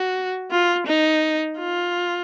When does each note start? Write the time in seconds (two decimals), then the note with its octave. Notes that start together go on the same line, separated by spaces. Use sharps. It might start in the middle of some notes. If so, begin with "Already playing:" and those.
Already playing: F#4
0.51 F4
0.87 D#4
1.59 F4